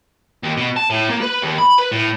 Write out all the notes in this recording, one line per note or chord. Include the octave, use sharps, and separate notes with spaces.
D#2
B2
A5
A2
A#3
B4
D#2
B5
B4
A2